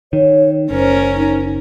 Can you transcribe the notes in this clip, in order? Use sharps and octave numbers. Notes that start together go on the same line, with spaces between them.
D#3 C#5
F#1 C#4 A#4 C5
D#4